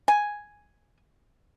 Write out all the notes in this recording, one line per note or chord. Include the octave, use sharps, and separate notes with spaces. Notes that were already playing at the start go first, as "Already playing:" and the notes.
G#5